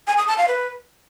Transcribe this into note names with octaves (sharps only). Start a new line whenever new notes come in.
G#5
D#6
A5
F5
B4